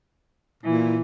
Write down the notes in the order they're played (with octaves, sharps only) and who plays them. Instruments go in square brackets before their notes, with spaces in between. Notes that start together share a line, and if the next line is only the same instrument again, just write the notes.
[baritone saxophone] A#2 [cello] E3